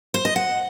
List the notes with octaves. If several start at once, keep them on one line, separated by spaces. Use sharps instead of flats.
C5
D#5
F#5